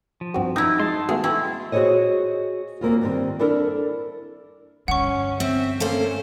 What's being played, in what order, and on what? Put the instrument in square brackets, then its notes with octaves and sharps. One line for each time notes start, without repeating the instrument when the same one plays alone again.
[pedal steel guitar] F3
[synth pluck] G2 C4 F#4
[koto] D#4 E4
[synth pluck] G#3 [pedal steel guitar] A5 C6
[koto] G#3 [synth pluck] A3 B3 F#4
[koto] E4 [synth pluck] G5 C#6
[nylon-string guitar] F#4 G#4 A4 C5 C#5 D#5
D2 A#3 C4 F4
G2 D#3 C4
D4 E4 A4 A#4
[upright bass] G2 D3 [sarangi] C#4 [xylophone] F#5 C#6
[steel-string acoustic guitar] C4 [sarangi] E5
[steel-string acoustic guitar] A3 A#3 C5 [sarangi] C#4